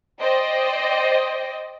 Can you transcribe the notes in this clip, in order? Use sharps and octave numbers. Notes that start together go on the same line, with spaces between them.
C5 D5 D#5 G5